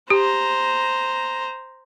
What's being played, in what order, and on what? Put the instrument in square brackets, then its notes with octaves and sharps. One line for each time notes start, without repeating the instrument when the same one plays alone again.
[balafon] G4 [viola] C5 A#5